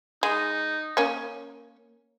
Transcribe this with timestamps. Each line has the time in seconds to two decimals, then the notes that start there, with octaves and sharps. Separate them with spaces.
0.23 G#3 D#4
0.97 A#3 C#4